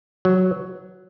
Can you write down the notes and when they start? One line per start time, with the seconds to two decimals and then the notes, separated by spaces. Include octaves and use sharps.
0.25 F#3